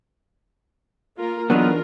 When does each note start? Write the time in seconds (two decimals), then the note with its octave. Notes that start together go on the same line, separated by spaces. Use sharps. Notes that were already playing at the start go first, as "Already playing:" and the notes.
1.16 A#3 F4 A#4
1.50 E2 F#3 B3 D4 D#4 F4 A#4